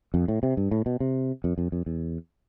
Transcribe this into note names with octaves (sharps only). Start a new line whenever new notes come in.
F2
A2
C3
G2
A2
B2
C3
F2
F2
F2
E2